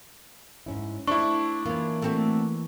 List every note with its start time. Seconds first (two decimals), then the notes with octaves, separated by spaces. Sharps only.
0.66 G#2 C#4 E4
1.07 A3 D4 E4 C5 C#6
1.66 E3 A#3 C#4 F4
2.02 A3 C4 F#4